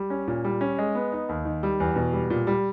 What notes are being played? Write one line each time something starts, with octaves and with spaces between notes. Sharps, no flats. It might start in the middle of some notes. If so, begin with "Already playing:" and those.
Already playing: G3
C#4
A#2
G3
C#4
G#3
B3
D#4
D#2
D#3
G3
E2
B2
G3
A#2
G3